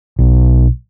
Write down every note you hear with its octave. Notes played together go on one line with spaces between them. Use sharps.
B1